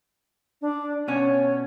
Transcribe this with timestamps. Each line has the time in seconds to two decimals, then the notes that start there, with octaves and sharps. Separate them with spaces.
0.62 D4
1.08 B2 C#4 C#5